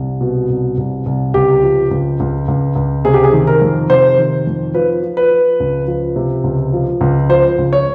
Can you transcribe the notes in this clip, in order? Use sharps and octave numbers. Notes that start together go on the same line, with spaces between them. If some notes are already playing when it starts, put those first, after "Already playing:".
Already playing: C2
B2
C2
C2
C2
C#2 G4
F3
C#2
C#2
C#2
C#2
C3 G#4
G4
G#4
D#3
A#4
F2
C3 C5
D#3
F2
F3 B4
F3
B4
F3
C#2
F3
C3
C#2
F3
C#2
F3 C5
C#2
C#5